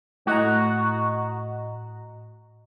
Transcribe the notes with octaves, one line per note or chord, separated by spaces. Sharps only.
A2 F#4 D#5 A#5